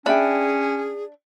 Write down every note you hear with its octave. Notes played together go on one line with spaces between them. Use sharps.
C#4 D4 G#4 D5 E5 G5 B5